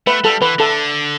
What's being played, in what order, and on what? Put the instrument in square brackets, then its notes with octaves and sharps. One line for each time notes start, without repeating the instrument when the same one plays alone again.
[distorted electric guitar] A3 [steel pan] B4
[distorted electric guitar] G3 [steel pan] A4
[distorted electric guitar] E3 [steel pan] B4
[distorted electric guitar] D3 [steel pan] A4